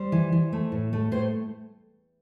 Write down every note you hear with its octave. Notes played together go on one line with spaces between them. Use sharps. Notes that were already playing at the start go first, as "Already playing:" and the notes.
Already playing: G3 C5
E3
E3
A3
A2
A3
A2 C5